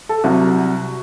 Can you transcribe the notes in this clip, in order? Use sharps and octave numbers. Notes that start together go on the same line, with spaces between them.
A4
C2 C3 F#3 F#4